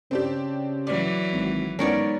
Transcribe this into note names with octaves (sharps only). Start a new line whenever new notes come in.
C#3 C4 D4 G4
E3 F#3 D5
G#1
G#2 B3 C#4 A#4 C#5 D5